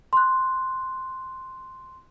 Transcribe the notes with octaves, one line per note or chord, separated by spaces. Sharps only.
C6 F#6